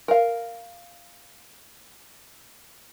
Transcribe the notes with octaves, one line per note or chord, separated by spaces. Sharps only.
A#4 F5